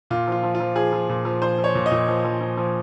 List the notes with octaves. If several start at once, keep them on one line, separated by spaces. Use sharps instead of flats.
A#2 F4
F3 F4
F3
F4
F3
F3 G#4
F3
A#2
F3
F3 C5
F3
C#5
A#2
D#5
A#2
F3
F3
F3
F3